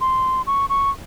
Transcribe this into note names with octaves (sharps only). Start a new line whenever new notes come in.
C6
C#6
C#6